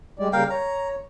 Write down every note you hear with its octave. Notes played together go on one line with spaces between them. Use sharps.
G3 G#3 D5
C#3 G3 A#3 A#4 F5 G5
C#5 A#5